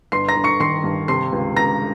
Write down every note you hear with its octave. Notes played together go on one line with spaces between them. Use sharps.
G1 C6 C7
A#5 A#6
G1
C#6 C#7
D#3 C6 C7
G2
C3 C6 C7
C#2
C#2 A#5 A#6